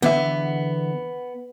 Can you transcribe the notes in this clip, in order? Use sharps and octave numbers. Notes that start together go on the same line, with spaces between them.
E2 D3 B3 E5